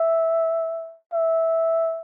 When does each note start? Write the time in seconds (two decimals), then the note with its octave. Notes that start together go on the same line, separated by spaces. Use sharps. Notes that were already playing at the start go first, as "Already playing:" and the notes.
Already playing: E5
1.13 E5